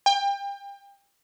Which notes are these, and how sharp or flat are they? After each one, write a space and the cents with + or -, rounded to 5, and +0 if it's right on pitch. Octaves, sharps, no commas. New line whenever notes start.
G5 +30